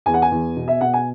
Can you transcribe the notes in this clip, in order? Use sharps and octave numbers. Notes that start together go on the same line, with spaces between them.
E2 G#5
F#5
G#5
E2
B2
E5
B2 F#5
G#5